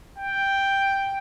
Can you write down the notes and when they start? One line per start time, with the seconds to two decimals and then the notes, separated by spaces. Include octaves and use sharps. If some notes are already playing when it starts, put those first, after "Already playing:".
0.18 G5